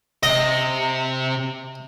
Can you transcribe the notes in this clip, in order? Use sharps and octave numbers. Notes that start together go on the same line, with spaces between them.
C3 D#5